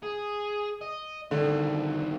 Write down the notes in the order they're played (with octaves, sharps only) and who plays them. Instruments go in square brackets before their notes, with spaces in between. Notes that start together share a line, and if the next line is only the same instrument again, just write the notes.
[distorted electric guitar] G#4
D#5
[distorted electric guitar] C2 D#3 [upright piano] D3